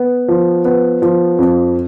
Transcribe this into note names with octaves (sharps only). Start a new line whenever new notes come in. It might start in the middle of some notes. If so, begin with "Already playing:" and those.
Already playing: B3
F3
B3
F3
F2